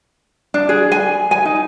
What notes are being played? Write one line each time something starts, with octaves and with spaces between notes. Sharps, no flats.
D4
G#4
G#5
G#5
D#4